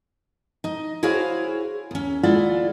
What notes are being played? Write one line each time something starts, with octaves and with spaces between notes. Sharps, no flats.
D#4 D#5
E4 F#4 G#4 C5 C#5 F5
D#2 C#4
D#2 G#3 E4 F4 D5 F#5